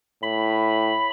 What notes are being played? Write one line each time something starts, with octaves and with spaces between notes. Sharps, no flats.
A2 B5